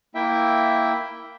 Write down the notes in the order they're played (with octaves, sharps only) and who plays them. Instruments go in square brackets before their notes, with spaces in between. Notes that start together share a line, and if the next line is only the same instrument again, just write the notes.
[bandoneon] A#3 E4 E5 G5